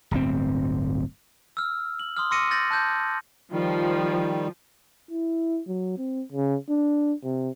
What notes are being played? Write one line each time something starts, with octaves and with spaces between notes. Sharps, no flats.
D1 G1 C4
E6 F6
F#7
C6 D#6 F6
C6 D6 E6 A#6 C#7 D#7
E6 G6 A6 A#6 F#7
A5 F#6 G6
D#3 F3 G3
E4
F#3
C4
C#3
D4
C3